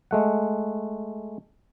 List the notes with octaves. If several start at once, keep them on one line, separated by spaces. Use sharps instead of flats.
G#3 A3 F#5